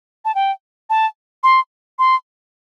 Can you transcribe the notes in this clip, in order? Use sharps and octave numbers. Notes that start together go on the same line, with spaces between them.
A5
G5
A5
C6
C6